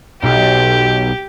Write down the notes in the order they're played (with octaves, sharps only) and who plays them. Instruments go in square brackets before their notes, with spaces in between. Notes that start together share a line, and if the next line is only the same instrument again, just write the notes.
[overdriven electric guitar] B1 [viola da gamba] G4